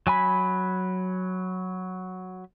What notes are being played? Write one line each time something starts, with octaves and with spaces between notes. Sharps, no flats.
F#3 G#5 B5